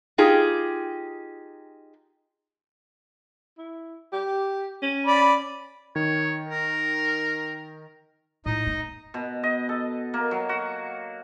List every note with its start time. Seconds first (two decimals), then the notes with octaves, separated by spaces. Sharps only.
0.18 D#4 F4 G4 G#4
3.58 E4
4.13 G4
4.82 C#4
5.07 D5 B5
5.96 D#3 C#5
6.49 A#4
8.46 A2 D#4 D#5
8.67 A#3
9.14 B2
9.43 D#5
9.69 A4
10.14 A#3
10.31 F#3
10.49 F#4